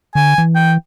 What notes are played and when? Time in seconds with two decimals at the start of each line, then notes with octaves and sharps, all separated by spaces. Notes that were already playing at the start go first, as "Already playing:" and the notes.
0.15 D3 G#5
0.38 E3
0.55 G5